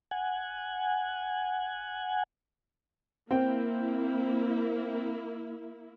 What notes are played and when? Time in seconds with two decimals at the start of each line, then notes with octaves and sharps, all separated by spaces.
0.11 F#5 G#5
3.31 A#3 C4 E4 G5